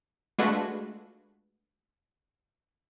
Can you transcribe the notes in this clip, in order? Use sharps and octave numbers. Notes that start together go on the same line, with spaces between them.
G#3 A3 D4 F4 F#4 B4